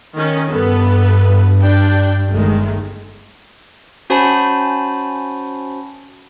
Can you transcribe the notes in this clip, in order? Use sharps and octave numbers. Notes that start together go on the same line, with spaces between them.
D#3 C#4
G2 B3 A4 B4
D4 G5
G1 D#3 G#3 A3
C#4 F#4 C5 G#5 A5 B5